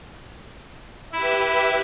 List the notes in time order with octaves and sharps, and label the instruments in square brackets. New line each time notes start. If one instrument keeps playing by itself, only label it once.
[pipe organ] E4 [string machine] G4 B4 E5